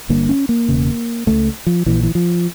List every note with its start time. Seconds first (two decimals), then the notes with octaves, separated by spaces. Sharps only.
0.09 G1 G2 D3 A#3
0.29 C#4
0.49 A#3
0.68 E1 E2 C#3
1.27 C#2 C#3 A3
1.67 F3
1.86 A#1 A#2 E3
2.03 E3
2.15 F3